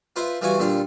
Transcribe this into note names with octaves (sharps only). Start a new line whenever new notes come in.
F4 B4 C5 E5
E3 G3 F4 F#4 G#5
A#2 D3 G3 F4